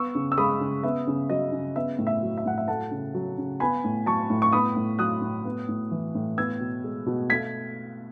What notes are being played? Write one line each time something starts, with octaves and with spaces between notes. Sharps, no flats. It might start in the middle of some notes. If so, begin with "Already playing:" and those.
Already playing: B3 C#6 E6
C#3
E6
G#3 B5 D#6
C#3
B3 E5
C#3
F#3 D#5
C#3
B3 E5
A2
E5
F#3
E5
A2 F#5
E5
A3 F#5 A5
C#3
F#3
C#3
B3 G#5 B5
A2
F#3 A5 C#6
A2
C#6
B3 B5 D#6
A2
F#3 D#6 F#6
A2
B3
A2
E3
A2
B3 E6 G#6
B2
G#3
B2
A3 G#6 B6